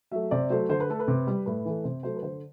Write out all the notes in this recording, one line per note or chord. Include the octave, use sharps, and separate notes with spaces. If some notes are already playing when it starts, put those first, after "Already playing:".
F#3 A3 E5
C3 D5
F#3 A3 C5
D3 C5
B4
A3 A4
B4
C3
G3
A2 B4
E3 A3
C3 C5
F#3 A3 C5
B4
D3 C5